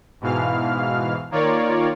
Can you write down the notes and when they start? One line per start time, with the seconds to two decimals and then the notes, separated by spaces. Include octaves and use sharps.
0.21 G#2 B2 E3 F5 F6
1.31 D#3 A#3 F4 A#4 C#5 D5